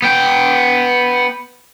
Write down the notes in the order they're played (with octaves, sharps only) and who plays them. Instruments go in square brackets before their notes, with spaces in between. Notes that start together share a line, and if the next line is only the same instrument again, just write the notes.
[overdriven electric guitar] B3 G5